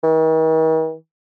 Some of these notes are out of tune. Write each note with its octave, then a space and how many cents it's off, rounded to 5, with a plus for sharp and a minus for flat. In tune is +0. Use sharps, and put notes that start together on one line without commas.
D#3 +45